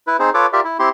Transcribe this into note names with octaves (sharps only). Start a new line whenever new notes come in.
E4 B4
C4 D#4 G#4 C5
F4 A4 B4 C#5 D6
F4 G4 A#4 D5 E5
E4
C4 E4 G4 C6